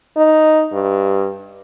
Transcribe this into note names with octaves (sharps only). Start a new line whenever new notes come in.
D#4
G2